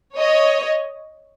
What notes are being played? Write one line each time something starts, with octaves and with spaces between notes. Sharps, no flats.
C#5 D#5